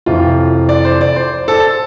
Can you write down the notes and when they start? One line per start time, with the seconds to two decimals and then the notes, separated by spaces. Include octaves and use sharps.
0.06 F2 C3 E3 F4
0.69 D5
0.85 C5
1.01 D5
1.16 C5
1.48 A4